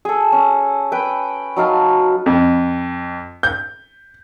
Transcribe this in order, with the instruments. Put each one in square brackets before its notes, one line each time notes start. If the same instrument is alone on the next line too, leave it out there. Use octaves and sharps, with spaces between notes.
[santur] G#4 A4
C#4
B4 G5
F#3 D#4 F5 A5
[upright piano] F2
G6